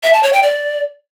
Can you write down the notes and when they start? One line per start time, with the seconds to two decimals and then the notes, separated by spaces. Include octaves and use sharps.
0.03 E5
0.13 A5
0.23 C#5
0.33 G5
0.43 D5